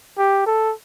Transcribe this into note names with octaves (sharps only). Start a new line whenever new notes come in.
G4
A4